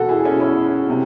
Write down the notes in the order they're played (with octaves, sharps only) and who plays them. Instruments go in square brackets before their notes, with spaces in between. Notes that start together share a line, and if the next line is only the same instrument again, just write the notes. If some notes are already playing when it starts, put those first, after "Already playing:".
Already playing: [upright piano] E1 F#4 A4
E4 G#4
C#4 E4
C#4 E4
C3